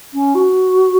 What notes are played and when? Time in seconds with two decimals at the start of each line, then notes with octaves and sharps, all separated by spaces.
0.13 C#4
0.34 F#4